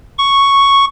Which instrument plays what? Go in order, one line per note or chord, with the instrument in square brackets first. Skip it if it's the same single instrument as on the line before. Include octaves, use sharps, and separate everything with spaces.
[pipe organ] C#6